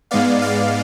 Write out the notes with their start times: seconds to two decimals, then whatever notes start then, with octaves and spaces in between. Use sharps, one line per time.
0.11 G#2 G#3 B3 D5 F5
0.41 D5 F5